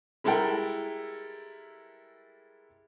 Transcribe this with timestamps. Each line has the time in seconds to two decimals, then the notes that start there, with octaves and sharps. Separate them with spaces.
0.24 G3 G#3 E4 A4 A#4 G5